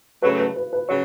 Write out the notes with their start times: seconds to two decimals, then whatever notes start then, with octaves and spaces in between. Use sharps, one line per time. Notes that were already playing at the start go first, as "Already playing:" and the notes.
0.22 C#3 F#3 A3 B4
0.39 B4
0.56 B4
0.73 B4
0.89 C#3 F#3 C#5